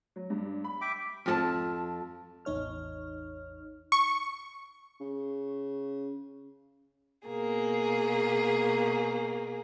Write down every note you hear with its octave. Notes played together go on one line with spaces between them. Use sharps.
F#3
G2
B5
E5 G5 D6
F2 G4 A5
A1 E2 D#4 C#5 F6
C#6
C#3
B2 A#3 G#4